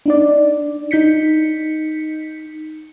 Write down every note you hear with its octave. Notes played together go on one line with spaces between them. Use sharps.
D4 D#4 D5
D#4 G6 B6 C#7